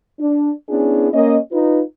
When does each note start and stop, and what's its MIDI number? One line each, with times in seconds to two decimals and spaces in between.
0.19 0.51 62
0.69 1.08 59
0.69 1.08 61
0.69 1.08 62
0.69 1.08 64
0.69 1.08 68
1.13 1.37 58
1.13 1.37 61
1.13 1.37 75
1.52 1.82 63
1.52 1.82 65
1.52 1.82 71